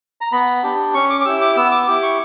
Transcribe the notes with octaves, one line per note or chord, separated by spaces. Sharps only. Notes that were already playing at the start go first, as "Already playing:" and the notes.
A#5
B3 B5
D4 G4
C#4 C#6
D6
D6
E4 G4 E6
D6
B3 E6
D6
E4 G4 D6
C#6